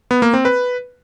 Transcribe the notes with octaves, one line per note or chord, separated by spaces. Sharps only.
B3
A#3
C4
B4